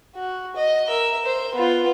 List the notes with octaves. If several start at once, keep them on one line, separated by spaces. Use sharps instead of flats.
F#4
D#5
A#4 E5
C5
B3 F4